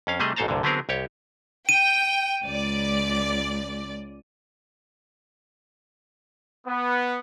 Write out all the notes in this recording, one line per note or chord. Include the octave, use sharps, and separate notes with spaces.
F2 C#4 F5
C3 G3 A3 G#4 D#5
A1 G#2 A4 C5 A5 A#5
C2 G2 A#2 D3
D3 F#3 B3 C4 G#4 A#4
C2 G4 C#5
G5 D#7
C#2 D5
B3